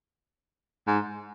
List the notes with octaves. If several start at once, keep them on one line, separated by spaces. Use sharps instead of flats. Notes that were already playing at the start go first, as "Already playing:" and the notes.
G#2